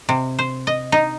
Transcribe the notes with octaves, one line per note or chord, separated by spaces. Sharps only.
C3
C5
D#5
D#4